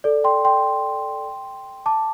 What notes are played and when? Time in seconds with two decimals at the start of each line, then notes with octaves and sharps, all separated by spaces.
0.04 A4 D5
0.24 G5 C6
0.45 G5 C6
1.86 A5 D6